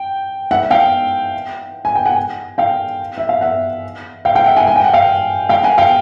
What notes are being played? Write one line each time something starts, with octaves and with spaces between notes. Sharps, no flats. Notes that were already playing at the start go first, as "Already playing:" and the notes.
Already playing: G5
E5 F#5
F5 G5
G#5
G5
F#5 G#5
F5 G5
E5
F5
E5 F#5
F5 G5
F5 G5
E5 F#5
F#5 G#5
G#5
G5
F#5
F5 G5
F5 G5
F#5 G#5
F5 G5